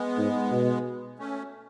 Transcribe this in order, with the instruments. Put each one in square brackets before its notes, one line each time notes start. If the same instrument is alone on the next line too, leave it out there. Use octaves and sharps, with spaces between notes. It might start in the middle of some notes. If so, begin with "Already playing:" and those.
Already playing: [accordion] G#3 B3
[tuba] G#2
B2
[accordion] A3 C#4